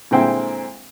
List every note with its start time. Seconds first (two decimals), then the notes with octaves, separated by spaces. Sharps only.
0.11 A#2 D3 G#3 C4 E4 G5